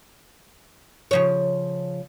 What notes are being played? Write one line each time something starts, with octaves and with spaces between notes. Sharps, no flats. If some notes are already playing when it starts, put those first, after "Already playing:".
C#3 F3 C#5